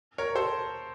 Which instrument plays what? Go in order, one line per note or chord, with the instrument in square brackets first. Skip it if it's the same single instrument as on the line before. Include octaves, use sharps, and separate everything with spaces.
[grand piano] A#4 C#5
A4 C5